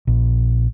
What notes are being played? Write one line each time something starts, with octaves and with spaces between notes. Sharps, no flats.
A#1